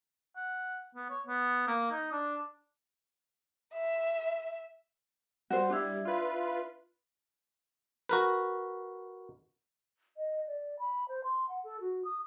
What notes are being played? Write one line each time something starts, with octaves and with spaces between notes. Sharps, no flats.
F#5
B3
C#5
B3
A#3
D#4
D4
E5
G3 F#4 C5
D4 E4
F4 B4
F#4 A#4 B4
D#5
D5
B5
C5
C6
F#5
A4
F#4
D#6